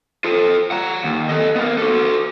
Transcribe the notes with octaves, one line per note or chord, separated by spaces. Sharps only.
F4 A4
F#5 A#5
D#2
A4 D#5
B3 A#4
F#4 A4